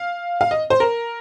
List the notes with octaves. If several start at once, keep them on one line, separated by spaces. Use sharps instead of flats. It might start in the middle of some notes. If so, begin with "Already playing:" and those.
Already playing: F5
F5
D#5
C5
A#4